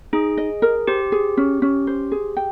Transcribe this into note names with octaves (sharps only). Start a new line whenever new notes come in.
D#4 G#4
D#5
A#4
G4 C5
G#4
C#4
C#4
C5
G#4
G5